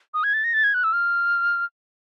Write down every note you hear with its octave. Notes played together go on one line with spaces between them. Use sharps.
D#6
G#6
A6
A#6
A6
G#6
F#6
E6
F6